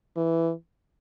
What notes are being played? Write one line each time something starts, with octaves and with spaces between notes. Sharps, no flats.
E3